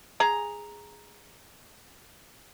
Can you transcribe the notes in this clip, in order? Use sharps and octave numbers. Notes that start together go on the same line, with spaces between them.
G#4 A#5